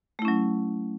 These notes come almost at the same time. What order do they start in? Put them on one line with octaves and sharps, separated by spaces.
A3 E4 C#4 F#3